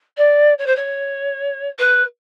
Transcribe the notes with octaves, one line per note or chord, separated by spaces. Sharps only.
D5
C#5
C5
C#5
B4